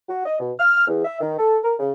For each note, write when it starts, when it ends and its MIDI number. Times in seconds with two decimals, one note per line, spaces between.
0.09 0.24 66
0.26 0.36 75
0.40 0.52 47
0.59 0.87 89
0.87 1.02 40
1.05 1.18 76
1.21 1.35 51
1.38 1.59 69
1.64 1.75 70
1.80 1.92 49